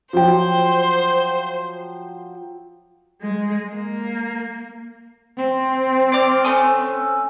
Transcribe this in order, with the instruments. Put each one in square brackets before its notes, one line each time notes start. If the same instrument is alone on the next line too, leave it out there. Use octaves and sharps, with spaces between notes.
[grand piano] F3 F#3 G5 [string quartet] C5
[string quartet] G#3
A#3
[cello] C4
[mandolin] D5 D6 F6
A3 C#4 D#6